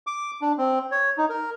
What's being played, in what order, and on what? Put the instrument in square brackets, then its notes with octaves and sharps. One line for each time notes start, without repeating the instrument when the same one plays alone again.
[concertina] D6
D4
C4
C#5
D#4
A#4